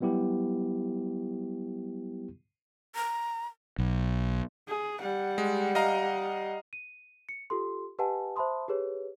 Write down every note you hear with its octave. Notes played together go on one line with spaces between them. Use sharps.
F#3 G3 B3 E4 G4
A#5
B1
G#4
G3 F#5
G#3
D#5 F5 A#5
D#7
C#7
F4 G4 A4 C6
G4 B4 D#5 F#5 G#5 A5
C5 E5 A5 B5 C6 D#6
G4 G#4 B4 C#5